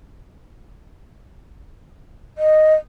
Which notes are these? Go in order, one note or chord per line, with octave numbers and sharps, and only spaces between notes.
D#5